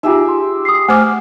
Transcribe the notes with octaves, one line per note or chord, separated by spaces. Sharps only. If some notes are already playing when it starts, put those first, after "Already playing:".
D#4 F4 G4 G#4 E5
C6
D#6 C7
A3 C5 G#5 D6 F6